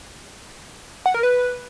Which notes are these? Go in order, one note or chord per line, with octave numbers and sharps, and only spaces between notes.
F#5
A#4
B4